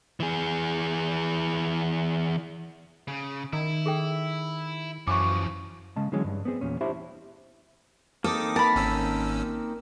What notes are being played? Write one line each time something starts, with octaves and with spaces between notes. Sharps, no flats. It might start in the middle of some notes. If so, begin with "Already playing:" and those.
E3 G#4
C#3
D#3 E4
G#4 A4 G5
F#2 E3 F3 C#6 D6
C#3 G#3 D#5 A5
D3 E3 F#3 G#3 C#4
G2
B3 C4 G#4
E2 A#2 C#4
D4 E4 F#4 G4 C5 E5
A#3 C4 D#4 A4 D6 D#6
A#4 A5 B5
G#1 C#4 E6